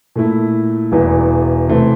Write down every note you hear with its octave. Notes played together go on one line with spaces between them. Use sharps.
A#2 A3 E4
E1 E2 E3
C3 E3 A3 C4